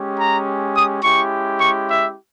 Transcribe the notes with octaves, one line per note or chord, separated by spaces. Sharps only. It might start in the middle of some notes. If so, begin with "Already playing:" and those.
Already playing: G#3 C#4 G4
A#5
D#6
G#3 C#4 E4 G4 C#6
C#6
E5